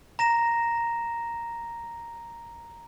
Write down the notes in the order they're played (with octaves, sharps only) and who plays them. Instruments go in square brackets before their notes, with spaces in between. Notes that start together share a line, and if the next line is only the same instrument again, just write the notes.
[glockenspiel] A#5 A#6 E7